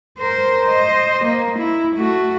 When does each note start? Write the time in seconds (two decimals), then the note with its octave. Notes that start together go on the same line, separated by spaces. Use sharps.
0.19 A#4 C5
0.67 C5 D#5
1.26 A#3
1.60 E4
1.97 A3 F#4